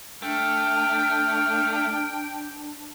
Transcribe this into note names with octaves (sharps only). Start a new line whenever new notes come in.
A3 D4 G5 F6